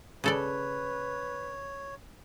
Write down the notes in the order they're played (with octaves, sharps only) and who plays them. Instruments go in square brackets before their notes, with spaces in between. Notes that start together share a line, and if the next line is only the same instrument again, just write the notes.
[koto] C#3 A4 D5 [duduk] B4 [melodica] C#5